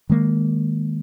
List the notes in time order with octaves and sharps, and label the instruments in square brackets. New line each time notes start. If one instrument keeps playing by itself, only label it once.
[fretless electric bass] D#3 G#3 A#3